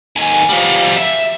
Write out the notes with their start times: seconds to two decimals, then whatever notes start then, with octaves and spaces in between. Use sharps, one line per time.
0.16 D#2 G#5
0.49 F3 G3
0.96 E5